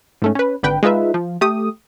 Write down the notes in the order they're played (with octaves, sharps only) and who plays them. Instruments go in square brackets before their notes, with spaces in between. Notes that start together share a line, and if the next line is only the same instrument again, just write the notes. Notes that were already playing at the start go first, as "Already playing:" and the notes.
[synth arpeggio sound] G#2 A3 C#4
C#4 B4
G#1 D3 B4 G5
G#3 D#4 F4 B4 E5
F3
A3 G4 D#6